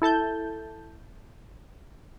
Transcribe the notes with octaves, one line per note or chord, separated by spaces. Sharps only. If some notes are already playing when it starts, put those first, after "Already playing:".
E4 A4 A5 G6